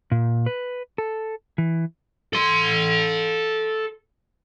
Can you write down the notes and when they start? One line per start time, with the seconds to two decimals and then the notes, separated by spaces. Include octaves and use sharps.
0.12 A#2
0.46 B4
0.98 A4
1.58 E3
2.33 A4 C6